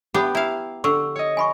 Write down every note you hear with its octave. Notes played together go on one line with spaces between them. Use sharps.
B3 G4 F#5 A5 B5
E4 F5 A#5
D3 C#6 E6
C#5 D#5
G#5 B5 C#6